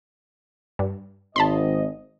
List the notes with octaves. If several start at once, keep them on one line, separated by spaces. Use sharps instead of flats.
G2
G#1 D#5 A5 B5 C6